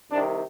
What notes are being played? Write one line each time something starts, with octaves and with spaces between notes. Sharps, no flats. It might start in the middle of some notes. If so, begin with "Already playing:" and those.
C2 C3 D#3 D4